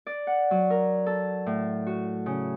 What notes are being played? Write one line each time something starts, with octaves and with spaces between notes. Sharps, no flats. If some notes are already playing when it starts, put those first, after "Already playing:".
D5
F#5
F#3
A#4
A4
A2
F#4
C#3